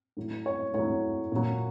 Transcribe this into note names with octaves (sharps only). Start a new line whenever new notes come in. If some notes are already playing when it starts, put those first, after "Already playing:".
A2 F#3
C#5
A2 F#3 C#5
A#2 F#3